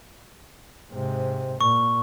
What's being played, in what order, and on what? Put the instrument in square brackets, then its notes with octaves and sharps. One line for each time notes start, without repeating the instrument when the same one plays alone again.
[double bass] G#2 C3
[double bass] A#2 [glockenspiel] C#6